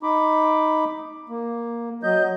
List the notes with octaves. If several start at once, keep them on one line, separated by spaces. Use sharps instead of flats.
D#4 B5 D6
A#3
F#3 D#5 G6